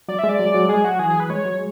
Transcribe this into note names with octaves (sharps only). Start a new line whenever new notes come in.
F#3 D5
E5
G#3
D5
F#3
G#3
F#3
G#3 G#4
F#3 F#4
E3 G#4
G#4
B4
G#3 C#5
F#3
G#3